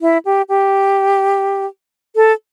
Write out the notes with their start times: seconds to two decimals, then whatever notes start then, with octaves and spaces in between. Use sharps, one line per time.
0.01 E4
0.25 G4
0.49 G4
2.16 A4